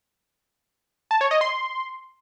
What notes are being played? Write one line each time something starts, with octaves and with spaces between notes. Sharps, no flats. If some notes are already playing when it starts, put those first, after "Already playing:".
A5
C#5
D#5
C6